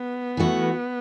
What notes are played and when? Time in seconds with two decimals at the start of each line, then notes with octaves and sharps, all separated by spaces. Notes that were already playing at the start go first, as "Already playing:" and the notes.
Already playing: B3
0.37 E3 A3 F#4